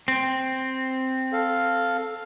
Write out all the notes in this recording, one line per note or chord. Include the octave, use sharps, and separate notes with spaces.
C4
A4 F5